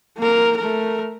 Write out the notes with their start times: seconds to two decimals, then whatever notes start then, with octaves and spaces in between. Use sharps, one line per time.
0.17 A#3 A#4
0.57 A3 A#4